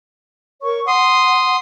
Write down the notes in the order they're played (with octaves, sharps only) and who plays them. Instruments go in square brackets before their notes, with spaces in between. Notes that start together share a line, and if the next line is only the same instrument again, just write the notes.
[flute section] A#4 C#5 C#6
[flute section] F#5 [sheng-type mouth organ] C6 D#6